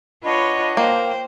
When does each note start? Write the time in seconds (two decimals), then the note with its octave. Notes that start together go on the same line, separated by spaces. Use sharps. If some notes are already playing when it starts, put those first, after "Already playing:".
0.23 D4 F4 B4 C#5 D#5 F#5 B5
0.77 A#3 C5 G5